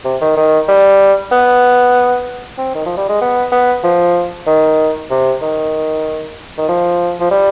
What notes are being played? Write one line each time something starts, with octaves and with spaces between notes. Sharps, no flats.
C3
D#3
D#3
G3
B3
C4
D#3
F3
G3
G#3
B3
B3
F3
D#3
C3
D#3
D#3
F3
F3
G3